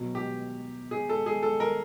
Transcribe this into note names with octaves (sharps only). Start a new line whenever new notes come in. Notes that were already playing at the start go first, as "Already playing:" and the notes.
Already playing: B2 F#3
G4
G#4
A4
G#4
A4
A#4